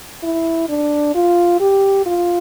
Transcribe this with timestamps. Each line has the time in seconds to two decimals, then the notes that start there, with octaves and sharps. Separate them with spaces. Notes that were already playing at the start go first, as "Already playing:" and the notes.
0.23 E4
0.69 D4
1.15 F4
1.60 G4
2.06 F4